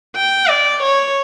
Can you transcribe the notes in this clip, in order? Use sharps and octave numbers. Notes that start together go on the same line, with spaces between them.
G5
D5
C#5